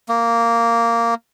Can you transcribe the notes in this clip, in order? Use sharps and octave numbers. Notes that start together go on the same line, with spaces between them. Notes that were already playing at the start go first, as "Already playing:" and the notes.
A#3